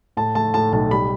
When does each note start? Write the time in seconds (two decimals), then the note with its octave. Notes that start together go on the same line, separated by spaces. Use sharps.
0.17 A2 A5
0.35 A3 A5
0.54 A2 A5
0.73 B1 A5
0.91 G3 B5